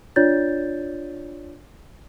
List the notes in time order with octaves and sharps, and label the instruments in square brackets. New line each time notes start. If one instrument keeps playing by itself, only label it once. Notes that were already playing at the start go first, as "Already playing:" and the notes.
[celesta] D4 F4 C#5 D5 G6 A6